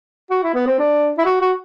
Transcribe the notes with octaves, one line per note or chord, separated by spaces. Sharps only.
F#4
E4
B3
C4
D4
E4
F#4
F#4